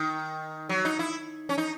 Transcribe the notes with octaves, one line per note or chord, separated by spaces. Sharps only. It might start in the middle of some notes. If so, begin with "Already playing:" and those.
Already playing: D#3
F#3
D#4
E4
C#4
D#4